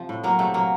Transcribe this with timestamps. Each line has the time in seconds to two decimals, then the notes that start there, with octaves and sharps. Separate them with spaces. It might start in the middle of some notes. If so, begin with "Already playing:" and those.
Already playing: C3 F3
0.09 A2
0.24 F#3 A#3
0.39 C3 A3
0.54 F#3 A#3